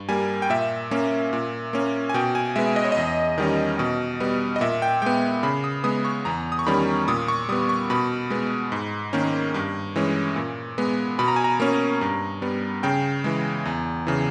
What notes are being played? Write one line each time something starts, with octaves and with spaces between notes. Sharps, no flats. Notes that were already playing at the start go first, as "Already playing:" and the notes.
Already playing: G2
G3 A#3 G#5
G5
A#2 E5
A#3 C#4
A#2
A#3 C#4
G#5
B2 G5
G#5
G#3 B3 E5
D#5
C#5
D#5
E2
D#3 G3 C#4
B2
G3 B3
D#5
A#2 E5
G5
G#3 B3 G5
C#3 B5
D#6
G#3 B3 D#6
C#6
E2 A#5
D#6
C#6
D#3 G3 C#4 B5
A#2 D#6
C#6
G3 B3 D#6
C#6
B2 B5
G#3 B3
G#2
D#3 A#3 C#4
G2
E3 G#3 C#4
A#2
G#3 B3
B2 B5
A#5
G#5
A#5
A#3 C#4
G2
G3 B3
C#3 G5
E3 G#3
E2
C#3 E3